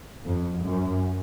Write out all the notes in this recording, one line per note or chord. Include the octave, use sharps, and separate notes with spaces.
F2
F#2